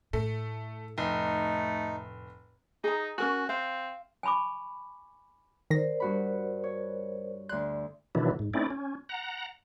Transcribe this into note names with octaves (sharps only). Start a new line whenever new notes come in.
A2 A3
F1 A3 D#4
D#4 G#4 A#5
C#4 F#4 A#4 G#5
C4 F5
G#5 A5 B5 C#6 D6
D#3 A#4 C5 D5 A#6
G2 F#4 B5
C#5
D2 D5 C6 F#6
B2 D#3 E3 F#3 D4 E4
G#2
A3 C4 C#4 D#4 E4 D5
C#4
F#5 A#5